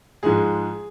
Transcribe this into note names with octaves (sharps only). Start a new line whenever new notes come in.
G#2 F3 G#3 G#4